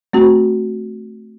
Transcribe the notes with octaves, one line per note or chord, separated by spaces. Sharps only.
A3 C4 F#4